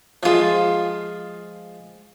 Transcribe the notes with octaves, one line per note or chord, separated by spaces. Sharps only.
F3 G#3 F4 F5